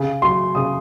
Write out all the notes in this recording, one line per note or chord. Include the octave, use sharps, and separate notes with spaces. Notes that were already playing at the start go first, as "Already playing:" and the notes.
Already playing: C#3
F#3 C6
C#3 D#6